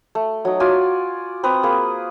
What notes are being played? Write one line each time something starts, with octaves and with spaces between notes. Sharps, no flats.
A3
F#3 D#4
F4 F#4 D5 G#5
C4 B4 A#5 D#6
A#3 G#4 B4